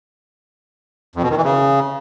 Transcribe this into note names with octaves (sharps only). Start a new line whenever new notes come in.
F2
B2
D#3
E3
C#3